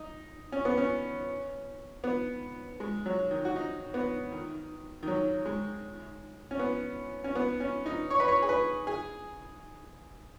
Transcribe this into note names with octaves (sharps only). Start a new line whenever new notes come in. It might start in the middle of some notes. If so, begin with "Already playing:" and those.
Already playing: D#4
C#4
B3
C#4
B3
G#3
F#3
D#3
F#4
D#4
B3
D#3
D#3
F#3
G#3
C#4
B3
C#4
B3
C#4
D#4
C#5
B4
C#5
G#4
B4
G#4